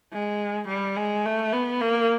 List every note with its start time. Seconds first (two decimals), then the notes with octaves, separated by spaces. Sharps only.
0.13 G#3
0.68 G3
0.97 G#3
1.25 A3
1.52 B3
1.81 A#3